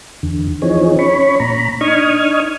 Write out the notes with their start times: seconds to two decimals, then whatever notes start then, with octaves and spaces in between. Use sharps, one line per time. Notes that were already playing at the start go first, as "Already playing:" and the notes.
0.23 E2 D3
0.62 E3 F3 C4 D#4 G#4 C#5
0.99 C#4 C#5 B5 C#6
1.40 A#2 A#5 B5
1.81 D4 D#4 C#6 D#6 F6 G#6